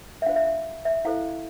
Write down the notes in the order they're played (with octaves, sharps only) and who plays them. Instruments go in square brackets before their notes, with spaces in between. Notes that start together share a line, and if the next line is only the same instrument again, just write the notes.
[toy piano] E5
D4 F4 C5 F5
E5
E5
E5
E4 A4 C5 F5